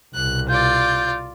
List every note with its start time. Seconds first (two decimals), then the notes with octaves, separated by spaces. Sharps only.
0.15 C2 B2 F#6
0.49 F4 D5 G6